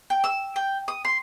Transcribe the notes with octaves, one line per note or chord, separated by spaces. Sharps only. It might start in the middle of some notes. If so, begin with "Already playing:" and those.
G5
E6
G5
D#6
C6